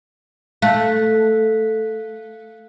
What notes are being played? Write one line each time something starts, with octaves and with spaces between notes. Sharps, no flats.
A3 F5 F#6 B6